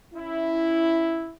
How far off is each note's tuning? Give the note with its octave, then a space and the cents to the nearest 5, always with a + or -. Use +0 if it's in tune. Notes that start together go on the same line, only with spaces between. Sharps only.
C#4 +0 E4 +0